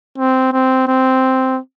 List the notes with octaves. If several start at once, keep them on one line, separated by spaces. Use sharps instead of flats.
C4
C4
C4